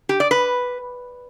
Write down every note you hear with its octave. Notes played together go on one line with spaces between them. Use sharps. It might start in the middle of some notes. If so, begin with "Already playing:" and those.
G4
D5
B4